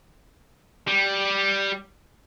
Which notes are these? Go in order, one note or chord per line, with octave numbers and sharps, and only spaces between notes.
G3